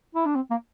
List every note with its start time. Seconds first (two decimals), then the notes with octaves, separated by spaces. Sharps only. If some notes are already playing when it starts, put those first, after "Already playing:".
0.15 E4
0.26 D4
0.36 C4
0.51 A#3